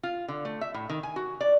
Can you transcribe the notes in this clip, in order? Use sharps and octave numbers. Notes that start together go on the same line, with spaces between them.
F4
D3
A3
E5
A2
D#3
G#5
F#4
D5